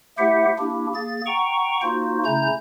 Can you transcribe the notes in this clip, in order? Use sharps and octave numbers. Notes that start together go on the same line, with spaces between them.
A3 E4 G4 C5 E5 F#5
A#3 D4 E4 G4
A#3 G#4 A6
F#5 G5 A#5 C#6
A#3 D#4 F4 F#4 C5
C#3 A3 C#4 E4 A#5 G6